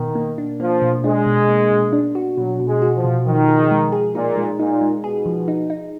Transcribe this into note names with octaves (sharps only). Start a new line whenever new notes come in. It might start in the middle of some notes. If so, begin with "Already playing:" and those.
Already playing: B2 D#3
A#3
D4
F3 A#3
B2
G#3 D4
B2
A#3
B2
D4
F#4
B2 F#3
B2
G#3
F#4
F3
B2
D#3 F3
G#4
G#3
G#4
A#2 D#4
G#3
A#2 D#4
G#3
B2 G#4
F3
D#4
D#4